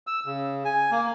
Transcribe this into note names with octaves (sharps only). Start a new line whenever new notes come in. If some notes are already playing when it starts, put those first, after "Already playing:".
E6
C#3
G#5
A#3